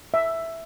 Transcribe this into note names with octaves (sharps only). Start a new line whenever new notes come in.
E5